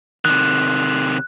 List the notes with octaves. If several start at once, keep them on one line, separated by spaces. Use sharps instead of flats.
C3 D#3 F#6